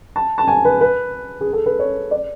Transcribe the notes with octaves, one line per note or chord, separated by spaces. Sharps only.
A5
A5
G#5
B4
B4
G#4
A4
B4
C#5
D5